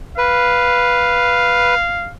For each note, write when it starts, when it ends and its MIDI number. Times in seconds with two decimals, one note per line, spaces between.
0.18 1.75 71
0.18 2.10 77